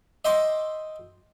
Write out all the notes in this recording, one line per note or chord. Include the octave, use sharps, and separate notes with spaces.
D#5 E5 G5 C6 D6 D#6